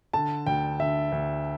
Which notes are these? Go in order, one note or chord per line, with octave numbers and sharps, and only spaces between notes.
D3 A5
D2 G5
D3 E5
D2